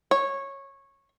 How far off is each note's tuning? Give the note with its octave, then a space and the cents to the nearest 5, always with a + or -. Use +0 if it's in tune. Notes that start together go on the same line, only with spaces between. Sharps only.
C#5 -15